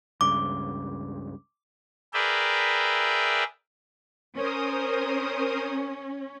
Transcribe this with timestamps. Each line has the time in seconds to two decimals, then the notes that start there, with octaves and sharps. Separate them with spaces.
0.21 C#2 G2 C#3 D6
2.14 G#4 A#4 B4 D5 E5 G5
4.36 C#4 A#4 C5 D#6